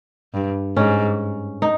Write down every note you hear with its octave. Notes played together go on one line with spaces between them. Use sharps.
G2
G#2 C#4
D#4